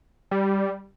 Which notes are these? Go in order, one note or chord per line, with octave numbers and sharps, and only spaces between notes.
G3